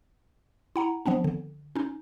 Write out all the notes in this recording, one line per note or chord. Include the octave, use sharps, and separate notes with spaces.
E4 F#5 A#5
F3 B3 C4 D4
D3
C#4 D#4